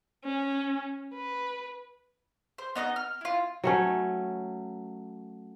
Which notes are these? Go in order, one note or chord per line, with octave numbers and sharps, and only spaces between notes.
C#4
B4
C5
B3 D#4 D5 D#5
F6
E4 F4
F#3 A3 C#4